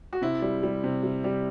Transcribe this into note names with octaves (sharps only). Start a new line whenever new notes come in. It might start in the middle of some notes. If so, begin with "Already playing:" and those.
F#4
C3 E4
G3
G3
C3
G3
G3